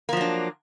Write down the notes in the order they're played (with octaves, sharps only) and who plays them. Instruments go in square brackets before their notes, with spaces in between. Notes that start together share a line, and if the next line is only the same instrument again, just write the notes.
[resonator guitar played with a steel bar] A#3
F3
F#3
D4